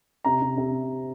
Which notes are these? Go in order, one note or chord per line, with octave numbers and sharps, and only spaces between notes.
C3 A#5
C3
C3